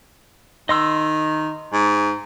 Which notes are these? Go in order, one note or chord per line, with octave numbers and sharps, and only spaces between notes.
D#3 D#5 C6 E6
G#2